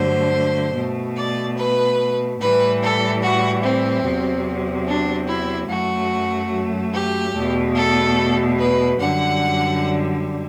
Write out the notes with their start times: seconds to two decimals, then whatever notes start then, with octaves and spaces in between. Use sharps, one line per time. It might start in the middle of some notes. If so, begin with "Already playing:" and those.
Already playing: G2 D3 F#3 A3 C5
0.74 B2 A3
1.15 D5
1.56 B4
2.39 A2 E3 G3 B4
2.81 A4
3.21 F#4
3.62 C4
4.03 E2 C3 F#3
4.86 D4
5.27 E4
5.69 F#2 F#3 A3 F#4
6.93 G4
7.33 E2 B2 A3
7.74 A4
8.58 B4
8.98 F#2 D3 G3 F#5